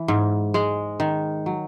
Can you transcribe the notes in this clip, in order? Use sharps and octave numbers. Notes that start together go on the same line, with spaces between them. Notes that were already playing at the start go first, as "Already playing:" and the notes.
Already playing: E3
G#2
G#3
D#3
F#3